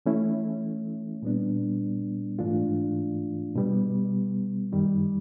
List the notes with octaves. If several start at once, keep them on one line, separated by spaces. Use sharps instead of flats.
E3 A3 C#4 E4
A#2 G3 B3 D4
G#2 E3 A3 D4 F4
B2 G3 B3
F#2 D#3 G3